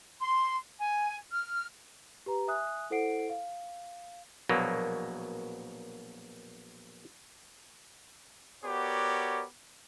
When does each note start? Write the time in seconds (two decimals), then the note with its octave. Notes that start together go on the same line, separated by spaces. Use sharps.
0.20 C6
0.78 G#5
1.32 F6
2.26 G4 B4 A#5
2.48 E5 G#5 D#6 F#6
2.90 E4 A4 C5 F#5 C7 D7
3.30 F5
4.49 A#1 B2 F#3 A#3
8.64 B3 F#4 G4 A#4 C#5 D5